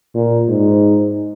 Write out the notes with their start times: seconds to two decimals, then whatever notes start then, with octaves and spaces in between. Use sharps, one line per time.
0.15 A#2
0.48 G#2